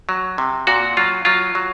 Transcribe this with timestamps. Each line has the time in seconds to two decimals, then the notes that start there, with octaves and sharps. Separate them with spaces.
0.09 F#3
0.38 C3
0.67 A#2 F#4
0.97 F#3 F4
1.25 F#3 F4
1.55 F#3